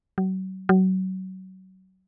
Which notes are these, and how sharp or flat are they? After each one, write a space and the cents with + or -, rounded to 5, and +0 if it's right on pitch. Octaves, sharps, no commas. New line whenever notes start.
F#3 +35
F#3 +25